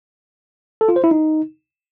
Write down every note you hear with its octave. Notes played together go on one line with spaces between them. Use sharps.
A4
F4
C5
E4
D#4